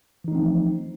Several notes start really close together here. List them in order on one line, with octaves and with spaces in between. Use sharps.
E3 D#4 A3 C4 F3